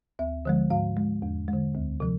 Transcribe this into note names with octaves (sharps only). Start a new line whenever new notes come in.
D2 E5
D3 F3 G#3
G#2 F5
G#3
E2
G#3
D3
D2
C3 F3